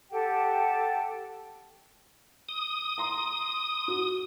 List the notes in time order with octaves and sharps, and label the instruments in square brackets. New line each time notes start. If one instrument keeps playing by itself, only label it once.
[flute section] G4 A4 F#5 G5
[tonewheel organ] D#6
[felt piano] A#5 C6
F#4